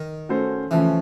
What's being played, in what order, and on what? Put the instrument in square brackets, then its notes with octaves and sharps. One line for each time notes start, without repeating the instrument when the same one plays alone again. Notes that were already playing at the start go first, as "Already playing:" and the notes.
Already playing: [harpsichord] D#3
[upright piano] A3 C#4 F#4 A4 C5
[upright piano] C#3 F3 A3 C#4 [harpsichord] E3